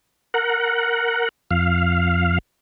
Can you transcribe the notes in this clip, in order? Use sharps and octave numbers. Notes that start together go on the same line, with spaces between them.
A#4 F#5
F2 F5